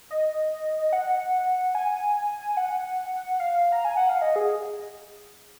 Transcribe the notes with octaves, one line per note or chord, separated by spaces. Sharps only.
D#5
F#5
G#5
F#5
F5
A#5
G#5
F#5
F5
D#5
G#4